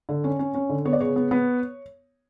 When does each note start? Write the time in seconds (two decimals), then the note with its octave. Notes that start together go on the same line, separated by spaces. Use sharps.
0.09 D3
0.24 C#4
0.39 C#4
0.54 C#4
0.69 D3
0.85 B3 C#5
0.93 D5
1.00 C#3 C#5
1.16 B3
1.31 B3